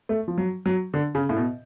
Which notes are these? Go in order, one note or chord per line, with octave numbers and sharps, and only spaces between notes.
A3
F3
F#3
F#3
D3
C#3
A2
B2